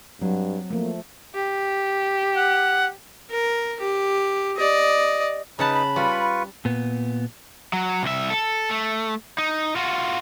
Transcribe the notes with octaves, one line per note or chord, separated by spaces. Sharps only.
G2 F#3 C4
F3 A3 A#3
G4
F#5
A#4
G4
D5 D#5
C#3 D#4 B4 F#5 A5 B5
B5
G3 F4 B4 C#6
A#2 B3
F#3
C2 E5
A4
A3
D#4
F4 F#4